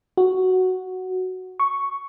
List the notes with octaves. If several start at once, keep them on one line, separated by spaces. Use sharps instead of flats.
F#4
C#6